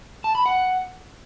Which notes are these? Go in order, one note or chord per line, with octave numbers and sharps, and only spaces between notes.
A5
B5
F#5